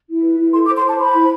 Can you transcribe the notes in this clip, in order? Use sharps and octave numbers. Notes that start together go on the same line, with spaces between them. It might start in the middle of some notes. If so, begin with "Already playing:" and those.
E4
B4
E4
A4 C6
D6
C5
C6
C5 A5
C5 B5
E4